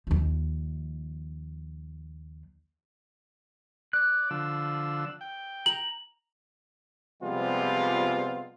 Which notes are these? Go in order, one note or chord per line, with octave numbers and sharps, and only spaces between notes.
D#2 F3
D5 F#6
D3 F3 E6
G5
A#5 F#7
C3 F3 G3 G#3 B3 F4